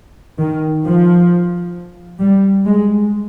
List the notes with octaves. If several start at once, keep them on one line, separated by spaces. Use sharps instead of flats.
D#3
F3
G3
G#3